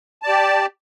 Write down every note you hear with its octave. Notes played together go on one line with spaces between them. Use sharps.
G4 D5 A5